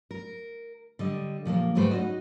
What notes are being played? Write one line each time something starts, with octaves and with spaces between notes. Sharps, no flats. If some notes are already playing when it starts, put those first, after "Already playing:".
A#4
D3 G3 D#5
A#2 F3 A3 A#3
D2 G#2 G3 A3 B4 C5
C#4 D#4 F4 F#4 D#5